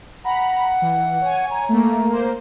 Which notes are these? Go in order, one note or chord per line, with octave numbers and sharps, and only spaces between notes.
F#5 A#5 B5
E3
C#5 G#5
A#5
A3 A#3
A#3 C5